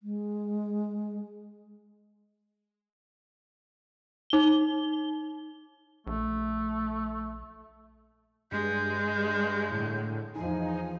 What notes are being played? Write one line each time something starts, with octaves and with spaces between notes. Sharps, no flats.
G#3
D#4 G7
A#1 A3
G2 G#3 G6
A2 D3
E2 F3 D#4 G#5